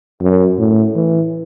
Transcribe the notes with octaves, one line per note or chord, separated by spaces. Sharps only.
F#2
A2
E3